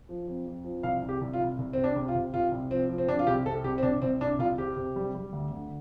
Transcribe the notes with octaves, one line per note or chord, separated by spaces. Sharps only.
F3
F2
F2
F3
C2 F5
C2
G4
C2
F4
C2
C2
C3 C4
D4
C3
F4
C3
C3 F4
C2
F3 C4
F3
C4
C3 D4
F4
C2 G4
C3 A4
C2 G4
C4
C2 D4
C2 C4
C2 D4
C2 F4
C3 G4
C3
G3
G3
D2
D3